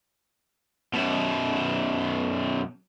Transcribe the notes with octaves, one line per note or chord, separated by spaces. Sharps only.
F#2 B2